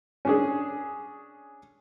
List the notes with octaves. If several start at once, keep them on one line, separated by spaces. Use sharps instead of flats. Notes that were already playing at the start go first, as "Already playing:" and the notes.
C#4 D4 G#4